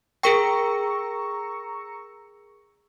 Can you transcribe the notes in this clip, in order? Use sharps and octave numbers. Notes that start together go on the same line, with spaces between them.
G#4 A#4 G5 A#5 C#6 E6